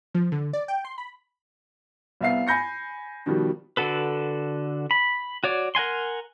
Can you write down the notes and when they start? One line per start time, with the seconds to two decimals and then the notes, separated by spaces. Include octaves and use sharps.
0.14 F3
0.32 D3
0.53 D5
0.68 G5
0.85 C6
0.98 B5
2.21 C2 B3 E5 F5 C7
2.47 G#5 B5 G6 A#6 C#7
3.26 B2 D#3 F3 G3
3.77 D3 F#4 A4 B4
4.91 B5
5.44 F#4 C#5 D5
5.75 A#4 F#5 G#5 C6